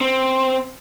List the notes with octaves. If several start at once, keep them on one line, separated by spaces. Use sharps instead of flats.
C4